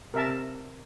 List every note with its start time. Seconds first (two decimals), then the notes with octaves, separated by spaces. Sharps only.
0.14 C3 A#4 E5 A5